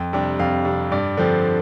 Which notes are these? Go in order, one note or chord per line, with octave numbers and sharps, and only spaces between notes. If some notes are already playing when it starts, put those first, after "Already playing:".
Already playing: F2
C3 G3 D4
F2 F5
C3 G3 D4
G2 D5
D3 F3 C4